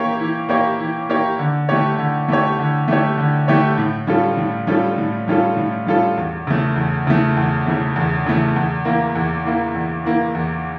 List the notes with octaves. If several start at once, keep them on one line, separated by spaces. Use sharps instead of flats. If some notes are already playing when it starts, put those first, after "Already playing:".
Already playing: E3 A#3 E4 G4 C#5
E3
A#3 E4 G4 C#5
E3
A#3 E4 G4 C#5
D3
A3 E4 G4 C#5
D3
A3 E4 G4 C#5
D3
A3 E4 G4 C#5
D3
A3 E4 G4 C#5
A2
G3 C#4 F4 A4
A2
G3 C#4 F4 A4
A2
G3 C#4 F4 A4
A2
G3 C#4 F4 A4
E2
C#3 E3 A3
E2
C#3 E3 A3
E2
C#3 E3 A3
E2
C#3 E3 A3
E2
E3 A#3 E4
E2
E3 A#3 E4
E2
E3 A#3 E4
E2